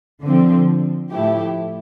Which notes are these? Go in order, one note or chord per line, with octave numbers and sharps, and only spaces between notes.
D3 F3 C4
A2 F3 A3 E4 G4